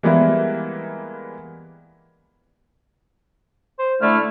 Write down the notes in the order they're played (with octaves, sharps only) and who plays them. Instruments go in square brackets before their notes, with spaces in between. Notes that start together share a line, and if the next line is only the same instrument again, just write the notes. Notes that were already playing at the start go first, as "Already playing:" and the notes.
[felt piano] E3 G3 G#3 A#3 B3 E4
[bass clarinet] C5
[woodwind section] D3 E4 F6 [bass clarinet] A3